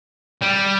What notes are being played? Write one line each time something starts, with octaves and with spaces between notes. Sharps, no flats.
G3